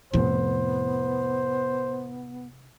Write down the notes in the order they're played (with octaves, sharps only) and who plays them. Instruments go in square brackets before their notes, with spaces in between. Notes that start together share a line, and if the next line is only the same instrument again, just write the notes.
[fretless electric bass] F2 A2 [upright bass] C3 E4 [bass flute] B3 [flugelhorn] C5